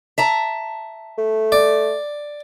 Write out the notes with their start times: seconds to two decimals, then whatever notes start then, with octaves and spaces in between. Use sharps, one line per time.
0.18 E5 A5 A#5
1.18 A3
1.52 D5